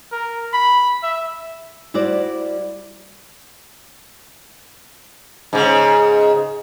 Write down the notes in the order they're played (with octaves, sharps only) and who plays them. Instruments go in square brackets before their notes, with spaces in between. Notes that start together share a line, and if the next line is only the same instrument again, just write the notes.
[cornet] A#4
B5
E5
[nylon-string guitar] G3 E4 F#4 C5 D5
[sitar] G#2 C#3